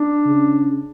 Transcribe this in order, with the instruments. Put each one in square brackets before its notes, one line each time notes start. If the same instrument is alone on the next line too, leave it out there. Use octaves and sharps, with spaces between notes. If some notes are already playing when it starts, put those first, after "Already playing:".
Already playing: [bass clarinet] D4
[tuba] C#3